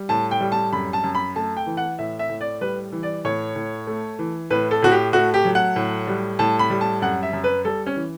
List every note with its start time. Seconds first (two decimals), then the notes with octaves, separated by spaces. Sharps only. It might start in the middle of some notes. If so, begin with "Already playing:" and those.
Already playing: G3
0.09 A2 A5
0.31 G5
0.41 G3
0.52 A5
0.72 F#2 B5
0.93 A5
1.03 F#2
1.15 B5
1.36 A3 A5
1.56 G5
1.66 E3
1.77 F#5
1.99 A2 E5
2.19 E5
2.29 A2
2.41 D5
2.61 G3 B4
2.92 E3
3.03 D5
3.24 A2 C#5
3.56 A2
3.87 A3
4.19 E3
4.50 A2 B4
4.71 A4
4.82 A2 F#4
4.92 G4
5.13 A3 F#4
5.34 G4
5.45 F#3
5.55 F#5
5.76 A2
6.07 G3
6.39 A2 A5
6.59 B5
6.70 G3
6.81 A5
7.02 F#2 F#5
7.23 E5
7.33 F#2
7.44 B4
7.65 G3 A4
7.86 C#4
7.96 E3